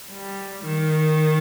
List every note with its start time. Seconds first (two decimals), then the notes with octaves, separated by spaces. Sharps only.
0.11 G3
0.66 D#3